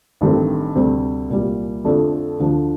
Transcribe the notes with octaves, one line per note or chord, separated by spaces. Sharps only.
A1 G2 D#3 A3 C4
D2 C3 G3 C4
C2 A#2 G3
F2 D3 F3 A3 D4
D2 D3 F3